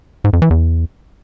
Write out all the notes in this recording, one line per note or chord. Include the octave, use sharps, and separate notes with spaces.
G#2
F2
E3
E2